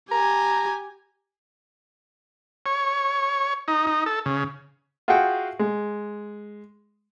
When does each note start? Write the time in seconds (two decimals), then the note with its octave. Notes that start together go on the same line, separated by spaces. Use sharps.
0.12 G4 G#5 A#5
2.66 C#5
3.68 D#4
3.87 D#4
4.06 A4
4.26 C#3
5.08 F4 F#4 G#4 E5 F#5 G5
5.59 G#3